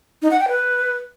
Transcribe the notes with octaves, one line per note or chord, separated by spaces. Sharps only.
D#4
F#5
G5
B4